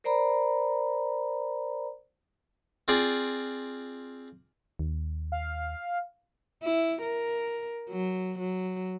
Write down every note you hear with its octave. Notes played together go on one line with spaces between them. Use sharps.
A#4 C5 D5 A#5 B5
C4 F4 G#4 D5
D#2
F5
E4
A#4
F#3
F#3